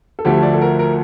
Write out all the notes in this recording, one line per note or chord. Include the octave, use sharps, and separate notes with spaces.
A4
D2 D3 F3 A3 G4
D5
A4
A#4
A#4